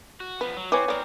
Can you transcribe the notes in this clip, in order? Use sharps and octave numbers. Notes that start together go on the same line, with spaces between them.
F#4
F3 B3 B4
F#3
C4 E4 B4 C#5 G#5 D6
B3 C4 A#4 D5